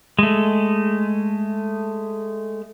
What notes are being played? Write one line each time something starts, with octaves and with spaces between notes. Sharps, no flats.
G#3 A3